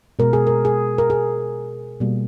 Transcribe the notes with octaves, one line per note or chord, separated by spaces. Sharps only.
B2 G#3 A#4
G#4
A#4
G#4
A#4
G#4
B2 G3 A#3